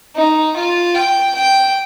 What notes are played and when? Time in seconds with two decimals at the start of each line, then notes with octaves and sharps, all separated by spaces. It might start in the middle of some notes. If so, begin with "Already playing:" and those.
0.16 D#4
0.56 F4
0.94 G5
1.34 G5